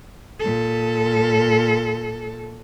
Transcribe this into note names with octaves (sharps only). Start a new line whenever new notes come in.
A#2 A4